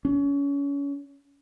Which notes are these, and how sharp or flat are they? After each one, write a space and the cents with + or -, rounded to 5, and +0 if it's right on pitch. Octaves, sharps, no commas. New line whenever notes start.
C#4 +30